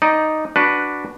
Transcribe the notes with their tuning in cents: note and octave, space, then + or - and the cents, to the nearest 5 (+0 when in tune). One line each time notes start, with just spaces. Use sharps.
D#4 +0 D5 +5
D4 +0 F#4 +0 B4 +0